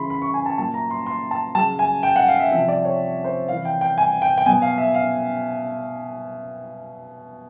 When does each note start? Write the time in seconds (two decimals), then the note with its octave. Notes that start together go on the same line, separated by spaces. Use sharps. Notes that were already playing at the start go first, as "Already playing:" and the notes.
Already playing: C#3 E3 B5 C6
0.10 B5
0.22 C#6
0.34 G#5
0.46 A5
0.58 A#2 F#3 A5
0.74 A#5
0.90 C6
1.06 C6
1.31 A5
1.55 C#3 F#3 A5
1.79 G#5
2.03 G5
2.16 F#5
2.28 F5
2.40 E5
2.52 C3 F3 E5
2.68 D5
2.85 C#5
3.24 C5
3.48 C3 E3 F5
3.65 G5
3.81 G5
3.98 G#5
4.22 G5
4.38 G5
4.46 B2 F#3 G#5
4.62 F5
4.78 E5
4.94 F5